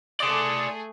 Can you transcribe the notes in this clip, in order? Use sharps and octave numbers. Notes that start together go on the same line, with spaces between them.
A3 G#4 D5 C6 D6 D#6